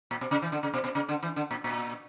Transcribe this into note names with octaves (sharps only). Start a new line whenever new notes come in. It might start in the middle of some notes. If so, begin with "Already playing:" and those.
A#2
B2
C#3
E3
D3
C#3
B2
B2
C#3
D3
E3
D3
A#2
A#2